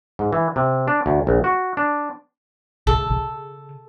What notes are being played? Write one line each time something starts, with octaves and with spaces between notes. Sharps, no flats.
G#2
E3
C3
D4
D2
A#1
F#4
D4
C#3 G#3 A4
C#3